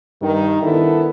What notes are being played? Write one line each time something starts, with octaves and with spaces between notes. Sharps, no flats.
G2 D#3
D#3 B3 D4 E4 A4